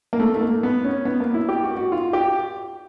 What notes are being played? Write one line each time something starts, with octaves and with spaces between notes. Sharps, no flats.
A#3
A3
A3
A#3
B3
C#4
B3
A#3
E4
G4
F#4
F#4
F4
G4